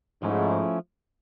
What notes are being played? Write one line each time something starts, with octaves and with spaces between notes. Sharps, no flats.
G#2 F3 A3 C#4 E4